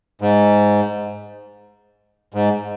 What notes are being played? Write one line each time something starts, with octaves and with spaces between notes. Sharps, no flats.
G#2
G#2